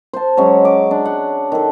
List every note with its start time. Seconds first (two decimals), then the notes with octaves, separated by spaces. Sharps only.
0.13 C5 A5
0.37 F#3 G#3 C#4
0.65 D6
0.91 D4
1.05 F#5
1.52 D#3 A4